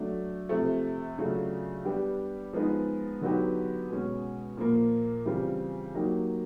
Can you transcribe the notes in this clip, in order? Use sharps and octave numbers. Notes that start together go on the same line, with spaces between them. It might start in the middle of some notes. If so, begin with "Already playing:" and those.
Already playing: F#3 A3 D4
C3 F3 A3
C#3 F#3 A3 D4 F4
G3 B3 D4 G4
F3 G#3 B3 D#4
D3 F#3 B3 D#4 G4
B2 G#3 C#4
A#2 F3 A#3
C#3 E3 G3 C4 F4
F#3 A#3 D#4 G4